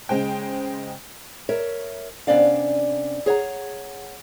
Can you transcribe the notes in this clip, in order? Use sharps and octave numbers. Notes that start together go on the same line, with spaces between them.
C#3 G#3 C5 G5
A#4 C#5 E5
C3 B3 C#4 D4 D5 F5
G#4 C#5 F#5 A#5